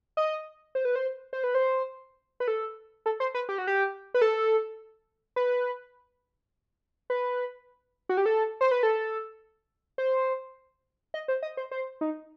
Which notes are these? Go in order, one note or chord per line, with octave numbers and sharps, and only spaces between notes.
D#5
C5
B4
C5
C5
B4
C5
B4
A4
A4
C5
B4
G4
F#4
G4
B4
A4
B4
B4
F#4
G4
A4
C5
B4
A4
C5
D#5
C5
D#5
C5
C5
D#4